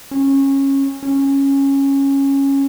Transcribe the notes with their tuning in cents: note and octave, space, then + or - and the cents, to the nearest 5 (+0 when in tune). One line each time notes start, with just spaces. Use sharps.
C#4 -20
C#4 -10